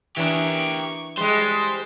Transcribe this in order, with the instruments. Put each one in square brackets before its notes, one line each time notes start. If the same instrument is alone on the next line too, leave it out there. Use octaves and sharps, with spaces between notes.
[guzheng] E3 D4 G#4 [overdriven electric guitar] G4 A#4 [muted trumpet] C#6
[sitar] G3 G#3 [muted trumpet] B4 [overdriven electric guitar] C5